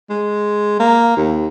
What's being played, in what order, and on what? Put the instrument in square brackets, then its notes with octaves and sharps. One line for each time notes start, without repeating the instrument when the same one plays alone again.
[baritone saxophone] G#3
A#3
D#2